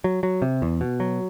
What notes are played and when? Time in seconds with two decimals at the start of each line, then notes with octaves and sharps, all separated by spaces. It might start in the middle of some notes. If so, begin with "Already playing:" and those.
0.04 F#3
0.23 F#3
0.42 C3
0.62 E2
0.81 B2
1.00 F#3